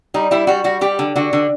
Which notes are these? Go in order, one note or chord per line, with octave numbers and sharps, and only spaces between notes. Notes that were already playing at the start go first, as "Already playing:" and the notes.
G3 D#4
G3 E4
G3 F#4
G3 F#4
G3 G4
D3
D3 F#4
D3